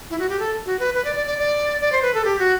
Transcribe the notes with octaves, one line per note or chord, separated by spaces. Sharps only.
E4
F#4
G4
A4
F#4
B4
B4
D5
D5
D5
D5
D5
C5
B4
A4
G4
F#4